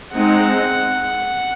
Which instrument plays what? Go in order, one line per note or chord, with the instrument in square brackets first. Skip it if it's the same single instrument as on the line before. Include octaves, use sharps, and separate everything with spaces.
[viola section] G#3 C4 D#4 [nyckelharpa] F#5